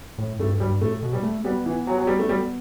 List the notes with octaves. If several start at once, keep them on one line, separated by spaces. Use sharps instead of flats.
A2
G2 A3
G2 G3
A2 A3
B2
G3
A3
G3 B3
E3
F#3
F#3
G3
A3
G3